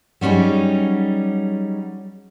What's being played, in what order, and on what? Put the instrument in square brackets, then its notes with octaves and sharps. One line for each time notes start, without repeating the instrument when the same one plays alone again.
[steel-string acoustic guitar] F#3 G3 C#4 D#4 G#4